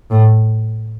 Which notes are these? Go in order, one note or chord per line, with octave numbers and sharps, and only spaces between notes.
A2